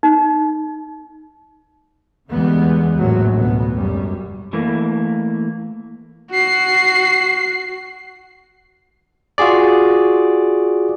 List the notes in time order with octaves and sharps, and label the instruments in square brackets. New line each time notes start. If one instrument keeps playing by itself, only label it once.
[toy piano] D#4
[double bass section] E2 D3 E3 G3 G#3 B3
A#1 F#2 A2 F#3
D2 B2 B3
G#1 F#2 G3
[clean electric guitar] E3 A3 A#3
[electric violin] F#4 C7
[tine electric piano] F4 F#4 G#4 D5